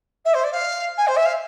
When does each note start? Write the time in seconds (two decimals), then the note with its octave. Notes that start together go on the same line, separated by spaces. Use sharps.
0.25 E5
0.34 C5
0.43 D5
0.52 F5
0.97 G#5
1.07 C5
1.16 E5
1.25 F5